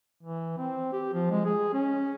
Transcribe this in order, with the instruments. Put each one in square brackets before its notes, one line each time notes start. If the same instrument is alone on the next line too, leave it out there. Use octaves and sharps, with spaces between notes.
[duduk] E3
C4
G4
F3
G#3
G#4
C#4